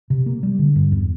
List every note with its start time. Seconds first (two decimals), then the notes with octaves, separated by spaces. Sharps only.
0.10 C3
0.26 A#3
0.43 G3
0.59 D3
0.76 G2
0.92 E2